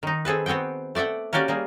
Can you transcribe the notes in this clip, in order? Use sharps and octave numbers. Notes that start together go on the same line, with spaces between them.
D#3 D#4
C4 G#4 A4 B4
B3 C4 F#4 G#4 G5
A3 D5 E5 F#5 G5
A#3 C#4 F#4 G4 D5
G3 A#3 G#4